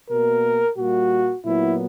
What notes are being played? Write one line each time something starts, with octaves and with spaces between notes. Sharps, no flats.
B2 A#3 A#4
A#2 G3 A#3 F#4
A#2 F#3 B3 E4